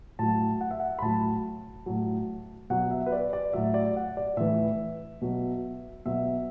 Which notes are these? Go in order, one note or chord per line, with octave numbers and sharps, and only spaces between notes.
A2 F#3 A5
F#5
E5
F#5
B5
A2 F#3 A5
A2 F#3
B2 F#3 F#5
E5
B4
D5
D5
A2 F#3 E5
D5
F#5
D5
A2 E3 E5
B2 F#3
B2 F#3 E5